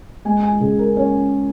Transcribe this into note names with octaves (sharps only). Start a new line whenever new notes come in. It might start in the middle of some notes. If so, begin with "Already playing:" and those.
G#3 G#5
G#5
C#3 G#4
A#4
C#4 C#5